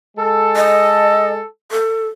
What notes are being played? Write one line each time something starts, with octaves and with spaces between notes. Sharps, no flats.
G#3 A4
D#5
A4